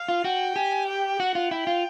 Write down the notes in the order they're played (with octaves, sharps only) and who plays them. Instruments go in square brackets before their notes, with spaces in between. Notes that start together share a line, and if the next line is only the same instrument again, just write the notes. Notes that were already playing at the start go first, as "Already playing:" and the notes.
Already playing: [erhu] F5
[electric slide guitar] F4
[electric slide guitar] F#4 [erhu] G5
[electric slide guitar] G4 [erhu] G#5
[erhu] G5
[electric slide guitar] F#4 [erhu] F#5
[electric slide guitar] F4
[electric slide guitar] E4 [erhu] G5
[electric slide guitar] F4